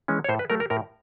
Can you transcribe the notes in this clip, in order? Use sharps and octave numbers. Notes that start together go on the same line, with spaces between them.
E3 G#3 C#4
C#5
A2 C5
B4
F#3 A3 A#4
A#4
A2 A#4